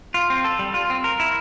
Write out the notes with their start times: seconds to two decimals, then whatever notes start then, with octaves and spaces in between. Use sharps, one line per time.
0.14 F4
0.30 C4
0.44 A4
0.59 G3
0.74 F4
0.90 C4
1.04 A#4
1.20 E4